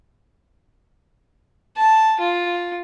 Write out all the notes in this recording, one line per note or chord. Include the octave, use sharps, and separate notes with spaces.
A5
F4